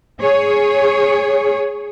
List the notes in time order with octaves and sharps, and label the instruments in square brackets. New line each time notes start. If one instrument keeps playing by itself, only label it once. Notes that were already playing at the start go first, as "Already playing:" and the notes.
[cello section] G#4 C#5